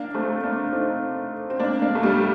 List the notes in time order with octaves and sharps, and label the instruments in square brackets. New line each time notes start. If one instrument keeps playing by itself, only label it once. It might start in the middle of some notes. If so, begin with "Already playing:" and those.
Already playing: [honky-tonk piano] A#3 D4
A3 C4
A#3 D4
C4 D#4
C4
A#3 D4
A#3 D4
A3
G3 A#3